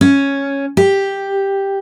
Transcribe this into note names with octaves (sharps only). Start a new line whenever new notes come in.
C#4
G4